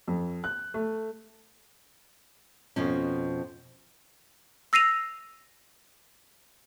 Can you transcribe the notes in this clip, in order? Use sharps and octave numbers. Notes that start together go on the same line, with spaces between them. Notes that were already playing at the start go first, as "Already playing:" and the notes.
F2
F#6
A3
F2 B2 F3 C#4
E6 A#6 C7 D#7 F7